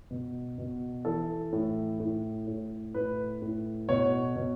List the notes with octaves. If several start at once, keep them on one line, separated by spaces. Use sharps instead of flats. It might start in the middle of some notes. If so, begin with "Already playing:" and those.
B2
B2
E3 A4
A2
A2
A2
A2 B4
A2
B2 C#5
B2